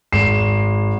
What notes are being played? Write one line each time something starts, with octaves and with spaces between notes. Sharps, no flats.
G#1 C7 E7